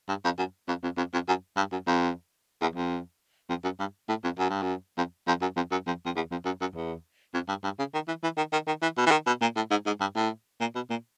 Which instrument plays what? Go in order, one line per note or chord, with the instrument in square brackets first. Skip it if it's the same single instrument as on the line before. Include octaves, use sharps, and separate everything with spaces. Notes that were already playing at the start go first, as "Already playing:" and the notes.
[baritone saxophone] G2
F2
F#2
F2
F2
F2
F2
F#2
G2
F#2
F2
E2
F2
F2
F#2
G2
A2
F2
F#2
G2
F#2
F2
F2
F#2
F2
F#2
F2
F2
E2
F2
F#2
F#2
E2
F2
G2
G2
C#3
D#3
E3
E3
D#3
D#3
D#3
E3
B2
E3
D#3
B2
A#2
A2
G#2
G#2
G2
A2
A#2
B2
A#2